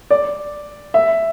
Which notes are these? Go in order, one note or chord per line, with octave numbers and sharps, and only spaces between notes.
D5
E5